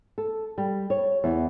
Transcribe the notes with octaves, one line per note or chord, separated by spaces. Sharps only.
A4
G3
C#5
E2